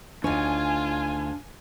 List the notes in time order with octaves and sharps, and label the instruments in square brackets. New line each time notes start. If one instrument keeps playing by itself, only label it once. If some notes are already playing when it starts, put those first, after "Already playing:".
[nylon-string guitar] D2 D#4 C#5 [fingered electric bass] D4 [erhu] F4 [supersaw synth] G#5